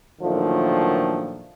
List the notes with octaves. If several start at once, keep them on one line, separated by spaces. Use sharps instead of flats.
A#2 D3 D#3 F3 F#3 A3